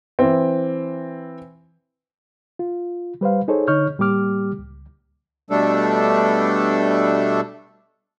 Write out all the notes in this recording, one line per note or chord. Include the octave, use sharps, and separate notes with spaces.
E3 C4
F4
G3 B4 C5 F5
D#4 G#4 A4 C5 C#5
D3 D#4 C#5 C#6 F6 G6
A2 G3 A#3 G4 D6 F6
C#2
B2 G3 A3 D4 A4